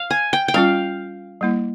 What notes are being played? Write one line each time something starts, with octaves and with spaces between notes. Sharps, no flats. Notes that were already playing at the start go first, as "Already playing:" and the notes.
Already playing: F5
G#5
G5
G5
G3 C#4 F4 F5
G3 A#3 E4